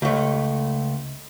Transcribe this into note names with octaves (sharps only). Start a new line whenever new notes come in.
C#2 A3